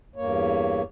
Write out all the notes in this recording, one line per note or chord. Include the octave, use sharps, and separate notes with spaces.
E2 G2 A#3 C#5